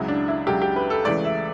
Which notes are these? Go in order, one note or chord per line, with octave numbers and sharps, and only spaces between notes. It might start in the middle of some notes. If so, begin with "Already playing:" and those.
Already playing: C#2 C#3 F#3 E4
D4
E4
C#2 C#3 F#3 G4
G4
B4
A4
C#2 C#3 E3 A3 D5
E5